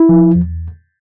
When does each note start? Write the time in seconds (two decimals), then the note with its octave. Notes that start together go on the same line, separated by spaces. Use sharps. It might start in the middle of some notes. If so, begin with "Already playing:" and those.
Already playing: E4
0.09 F3
0.35 E2